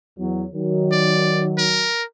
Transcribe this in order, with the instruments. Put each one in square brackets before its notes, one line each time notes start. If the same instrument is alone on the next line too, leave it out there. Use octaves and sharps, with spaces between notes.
[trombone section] E2 F#3
D#3 F#3
[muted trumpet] D5
A#4